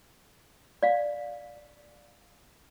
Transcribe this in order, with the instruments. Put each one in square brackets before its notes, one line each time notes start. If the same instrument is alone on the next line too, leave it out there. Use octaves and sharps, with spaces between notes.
[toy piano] D5 F5